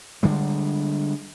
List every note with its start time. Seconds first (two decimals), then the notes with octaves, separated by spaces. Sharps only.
0.23 D3 G3 G#3